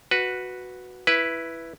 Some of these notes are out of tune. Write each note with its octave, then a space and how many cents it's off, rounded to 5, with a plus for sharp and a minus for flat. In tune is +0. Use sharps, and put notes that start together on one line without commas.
F#4 -5 B4 +0
E4 +5 B4 +0